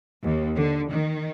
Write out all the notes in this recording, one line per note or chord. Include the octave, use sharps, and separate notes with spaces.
D#2
D3
D#3